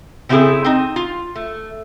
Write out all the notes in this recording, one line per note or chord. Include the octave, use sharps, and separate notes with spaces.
C#3 C4 E4 F4 G#4 A4
C4 D#4
F4
A3